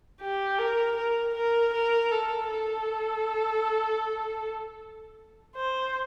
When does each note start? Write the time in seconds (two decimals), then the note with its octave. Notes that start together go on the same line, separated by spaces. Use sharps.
0.21 G4
0.59 A#4
0.96 A#4
1.34 A#4
1.74 A#4
2.11 A4
2.50 A4
5.56 C5